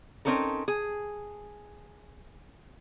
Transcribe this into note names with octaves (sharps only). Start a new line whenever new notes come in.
C4 C#4 D#4 A4 A#4
G#4